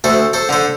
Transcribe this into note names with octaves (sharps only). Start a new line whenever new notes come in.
D2 A4 C5
A4 C5
D3 C5